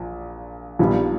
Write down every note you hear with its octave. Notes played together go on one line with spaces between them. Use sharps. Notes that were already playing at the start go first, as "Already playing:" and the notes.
Already playing: A#1 A#2
A#1 A#2 G3 B3 D#4